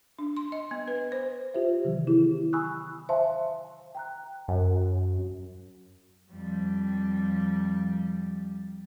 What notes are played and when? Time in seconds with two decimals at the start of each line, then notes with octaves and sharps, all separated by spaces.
0.19 D4
0.37 C6
0.52 D#5
0.71 B3
0.88 B4
1.12 C5
1.54 F4 G4 C5 E5
1.84 C3 D#3 E3 F#3
2.07 B3 E4 G4 G#4
2.53 G#5 B5 C#6 D#6 E6 F#6
3.09 C5 E5 F5 G#5 A5 C6
3.95 G5 A#5 F#6
4.48 F#2
6.31 F2 G3